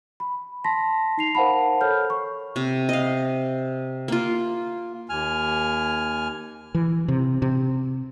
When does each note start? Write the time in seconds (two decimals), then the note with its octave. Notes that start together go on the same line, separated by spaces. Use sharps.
0.20 B5
0.64 A5 C6 A#6 B6
1.18 D#4 C7 F7
1.35 A#4 C5 F5 F#5 A5 B5
1.81 A4 C#5 F6 G6
2.10 C#6
2.56 C3
2.89 D#5 F5
4.08 A#3 F4
5.09 D#2 G#5 F6
6.75 E3
7.08 C3
7.42 C3